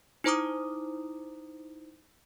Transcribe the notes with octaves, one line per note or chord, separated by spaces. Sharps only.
D#4 E4 C5 A#5 D6 D#6